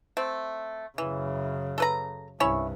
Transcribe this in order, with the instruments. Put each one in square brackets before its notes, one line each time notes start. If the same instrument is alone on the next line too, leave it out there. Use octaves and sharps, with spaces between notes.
[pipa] A3 C4
[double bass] F#2 C#3 [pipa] E3
[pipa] A4 B4 A#5
[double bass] C2 G2 [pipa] C#4 E4 C#5